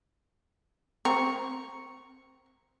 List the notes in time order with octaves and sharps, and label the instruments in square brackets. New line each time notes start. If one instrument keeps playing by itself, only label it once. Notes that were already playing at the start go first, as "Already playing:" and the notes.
[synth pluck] C4 [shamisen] A#4 [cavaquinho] C#6